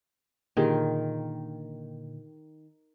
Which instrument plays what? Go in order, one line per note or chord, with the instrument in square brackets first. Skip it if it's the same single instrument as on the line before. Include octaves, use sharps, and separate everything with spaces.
[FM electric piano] A#2 D3 [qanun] D#3 [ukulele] F4 G4 G#4